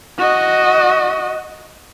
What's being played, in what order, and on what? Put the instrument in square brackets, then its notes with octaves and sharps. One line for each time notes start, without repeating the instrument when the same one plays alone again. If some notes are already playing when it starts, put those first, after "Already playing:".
[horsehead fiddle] F#4 D#5